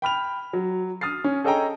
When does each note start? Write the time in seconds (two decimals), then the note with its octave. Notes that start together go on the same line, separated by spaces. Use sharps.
0.02 G5 B5 F6 F7
0.53 F#3
1.01 D#6 F6 A6 C7
1.24 C#4
1.44 G#4 A4 C#5 D#5 G5 A#5